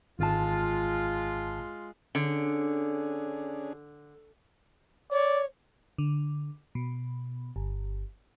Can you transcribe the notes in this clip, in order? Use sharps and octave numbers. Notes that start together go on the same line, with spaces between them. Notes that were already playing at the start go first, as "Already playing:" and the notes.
G#1 G#3 F4 A5
D3 C#4 D4 G#4
C#5 D5
D3
B2
G1